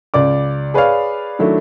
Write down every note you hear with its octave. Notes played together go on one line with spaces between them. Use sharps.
C#2 D5 D6
G#4 B4 C#5 D5 F5
D#3 F#3 A3 D4 E4